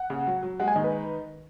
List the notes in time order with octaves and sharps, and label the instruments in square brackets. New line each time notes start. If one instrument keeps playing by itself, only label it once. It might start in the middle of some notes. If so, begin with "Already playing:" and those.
Already playing: [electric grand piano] F#5
[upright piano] C#3
F#3
F#3
[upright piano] G#3 [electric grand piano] F#5
[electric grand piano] G#5
[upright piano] D#3 [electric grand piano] D#5
[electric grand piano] B4
[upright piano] D#4